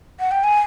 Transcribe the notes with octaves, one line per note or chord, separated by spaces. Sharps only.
F#5
G5
G#5